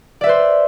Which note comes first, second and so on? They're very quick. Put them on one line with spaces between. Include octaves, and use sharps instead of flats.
D5 E5 B4 C5